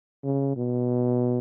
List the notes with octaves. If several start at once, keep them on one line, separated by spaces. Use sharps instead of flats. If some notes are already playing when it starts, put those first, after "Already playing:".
C#3
B2